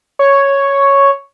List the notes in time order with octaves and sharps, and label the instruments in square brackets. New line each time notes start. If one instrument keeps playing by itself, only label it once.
[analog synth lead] C#5